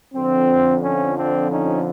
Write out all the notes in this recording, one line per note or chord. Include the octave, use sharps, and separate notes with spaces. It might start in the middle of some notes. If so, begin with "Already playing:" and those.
F2 D3 F3 C4
C#4
C4 D4
C#4 D#4